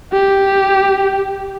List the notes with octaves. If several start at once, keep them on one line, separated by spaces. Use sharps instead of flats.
G4